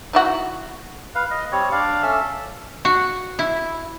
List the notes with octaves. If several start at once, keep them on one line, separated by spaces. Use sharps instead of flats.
D#4 E4 F#4
B4 F5
D#5
G3 C4 C#5
D4 D5 F5
C#4 A4 E5 E6
F#4
E4